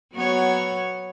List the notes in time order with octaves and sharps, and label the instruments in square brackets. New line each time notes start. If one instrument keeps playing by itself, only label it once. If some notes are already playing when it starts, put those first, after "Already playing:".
[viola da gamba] F#3 B3 C#5